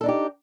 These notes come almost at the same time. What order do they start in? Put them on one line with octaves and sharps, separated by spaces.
A4 D4 D#4 G4